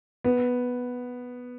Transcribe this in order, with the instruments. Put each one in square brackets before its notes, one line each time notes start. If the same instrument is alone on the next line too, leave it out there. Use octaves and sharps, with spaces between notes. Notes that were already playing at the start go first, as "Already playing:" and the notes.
[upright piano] B3